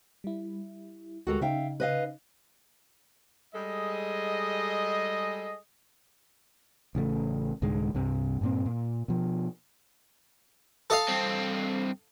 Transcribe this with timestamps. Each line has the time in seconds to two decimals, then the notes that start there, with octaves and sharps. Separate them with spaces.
0.24 G3 E4
1.27 D2 G#3 F#4 G4 A4 A#4
1.41 C#3 D#4 E5 F5 G5
1.80 B4 D#5 F5
3.55 G3 G#3 G#4 A4 D#5
6.95 A1 C#3 E3 A3
7.62 C2 G#2 D3 G#3
7.94 C2 G2 C3
8.41 G2 A#2 C4
8.66 A#2
9.08 B2 F3
10.90 A4 D#5 F5
11.08 G2 C4